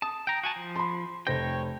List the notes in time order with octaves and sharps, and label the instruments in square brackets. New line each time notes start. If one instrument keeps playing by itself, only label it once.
[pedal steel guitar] A5 [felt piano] D#6
[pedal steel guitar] G5 A#5
F#4 G#5 A5
F3
[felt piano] B5 C6
[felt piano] F1 C5 A#6 [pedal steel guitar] C#5 G5